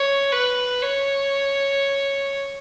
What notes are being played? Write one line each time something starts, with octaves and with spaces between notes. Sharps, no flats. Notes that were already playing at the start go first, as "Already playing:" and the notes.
Already playing: C#5
B4
C#5